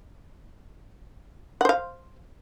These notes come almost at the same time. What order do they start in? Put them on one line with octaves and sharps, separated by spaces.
F#5 C5 F5